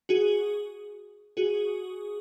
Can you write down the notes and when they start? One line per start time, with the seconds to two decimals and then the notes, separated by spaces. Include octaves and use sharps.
0.09 F#4 G#4
1.37 F#4 G#4